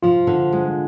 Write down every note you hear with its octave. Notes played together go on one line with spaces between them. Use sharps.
F3 F4
D3
G#3